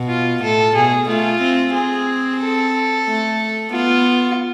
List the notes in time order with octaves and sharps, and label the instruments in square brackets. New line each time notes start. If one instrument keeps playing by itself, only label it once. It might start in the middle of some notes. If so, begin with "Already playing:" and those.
Already playing: [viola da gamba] B2
[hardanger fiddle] F4
[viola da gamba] A2 [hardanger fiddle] A4
[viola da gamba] B2 [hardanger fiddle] G#4
[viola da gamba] A3 [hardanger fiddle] F4
[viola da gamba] C4
[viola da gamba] C4 [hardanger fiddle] G#4
[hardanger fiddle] A4
[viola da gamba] A3
[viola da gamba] B3 [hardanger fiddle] F4